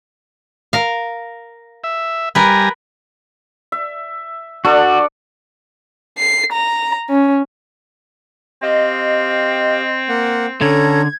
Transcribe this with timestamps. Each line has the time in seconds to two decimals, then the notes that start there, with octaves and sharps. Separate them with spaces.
0.73 A#4 F5
1.84 E5
2.35 G3 A#4 B4 G#5 A#5
3.72 E5
4.65 D4 F#4 A4 D5
6.18 C7
6.52 A#5
7.10 C#4
8.63 C4 G4 D#5 F5
10.08 A#3 F#5
10.61 D3 C#4 A4 A#5 G#6